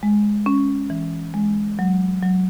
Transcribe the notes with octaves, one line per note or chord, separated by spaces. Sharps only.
G#3
C#4
E3
G#3
F#3
F#3